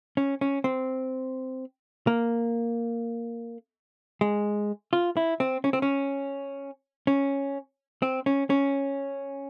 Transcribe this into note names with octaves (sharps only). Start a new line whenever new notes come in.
C#4
C#4
C4
A#3
G#3
F4
E4
C4
C#4
C4
C#4
C#4
C4
C#4
C#4